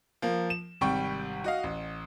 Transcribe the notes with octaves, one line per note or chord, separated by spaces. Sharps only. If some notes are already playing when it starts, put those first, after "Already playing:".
F3 A#3
E7
G#1 C3 G3 G5 C#6
F#4 D#5 F5
A1